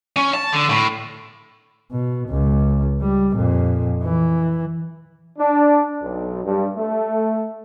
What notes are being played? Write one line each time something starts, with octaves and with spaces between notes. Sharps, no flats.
C#4
A5
D3
A2
B2
C#2
G3
F2 A#2
E3
D4
B1
G2
A3